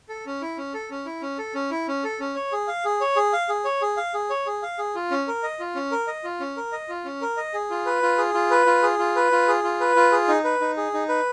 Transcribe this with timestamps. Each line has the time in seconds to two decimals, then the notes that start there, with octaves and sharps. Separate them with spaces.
0.09 A4
0.26 C#4
0.42 E4
0.57 C#4
0.74 A4
0.91 C#4
1.06 E4
1.22 C#4
1.38 A4
1.55 C#4
1.71 E4
1.88 C#4
2.04 A4
2.20 C#4
2.36 C#5
2.52 G#4
2.68 F5
2.85 G#4
3.01 C#5
3.16 G#4
3.33 F5
3.49 G#4
3.65 C#5
3.82 G#4
3.97 F5
4.14 G#4
4.30 C#5
4.46 G#4
4.62 F5
4.78 G#4
4.95 F4
5.11 C#4
5.28 A#4
5.43 D#5
5.60 F4
5.75 C#4
5.91 A#4
6.07 D#5
6.24 F4
6.40 C#4
6.57 A#4
6.72 D#5
6.89 F4
7.05 C#4
7.21 A#4
7.37 D#5
7.54 G#4
7.70 F4
7.86 B4
8.03 F4
8.18 G#4
8.34 F4
8.50 B4
8.66 F4
8.82 G#4
8.99 F4
9.16 B4
9.32 F4
9.48 G#4
9.63 F4
9.80 B4
9.96 F4
10.12 G#4
10.28 D#4
10.44 B4
10.61 D#4
10.77 G#4
10.94 D#4
11.09 B4